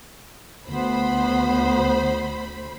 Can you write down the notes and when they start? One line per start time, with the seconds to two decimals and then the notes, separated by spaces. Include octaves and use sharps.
0.67 D2 B3 C5 B5